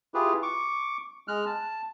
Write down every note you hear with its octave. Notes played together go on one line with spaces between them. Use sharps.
E4 F4 G4 G#4 B4
C#6 D6
G#3 F6 F#6
A5